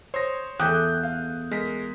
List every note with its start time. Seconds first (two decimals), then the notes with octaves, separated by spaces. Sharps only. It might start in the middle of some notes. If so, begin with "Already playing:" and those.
0.14 C5 C#5 C6 D#6 A#6
0.60 E2 A3 G5 D6 D#6 F#6 G6
1.03 F5
1.51 G#3 A#4 B6